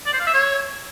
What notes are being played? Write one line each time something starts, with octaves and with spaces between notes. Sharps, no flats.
D5
C5
F5
E5
C#5